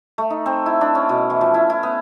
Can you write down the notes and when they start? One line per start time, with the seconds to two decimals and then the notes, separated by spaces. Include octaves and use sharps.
0.18 A3
0.30 D#4
0.46 C4
0.66 E4
0.81 D4
0.95 C#4
1.09 B2
1.30 E3
1.41 F3
1.54 E4
1.70 E4
1.83 B3